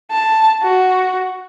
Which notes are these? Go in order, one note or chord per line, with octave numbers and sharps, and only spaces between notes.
A5
F#4